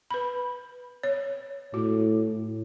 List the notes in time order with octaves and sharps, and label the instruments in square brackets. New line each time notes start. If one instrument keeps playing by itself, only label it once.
[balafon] B4 B5
C#5
[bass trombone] A2 [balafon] F#4